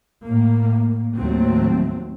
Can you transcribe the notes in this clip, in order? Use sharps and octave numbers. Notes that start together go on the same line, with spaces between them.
A2 A#3
D#2 A2 D#3 F#3 A3 C4